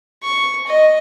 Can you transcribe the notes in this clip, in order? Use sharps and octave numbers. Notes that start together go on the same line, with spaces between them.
C#6
D#5